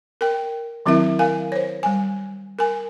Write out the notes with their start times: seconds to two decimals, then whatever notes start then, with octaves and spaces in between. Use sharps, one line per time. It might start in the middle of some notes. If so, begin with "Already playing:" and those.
0.21 A#4 G5
0.86 D#3 F#3 C4 E4 A#4 E5
1.19 A#4 F5 G#5
1.52 C5 C#5
1.83 G3 G#5
2.59 A#4 G#5